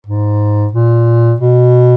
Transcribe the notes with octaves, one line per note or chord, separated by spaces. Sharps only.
G#2
A#2
B2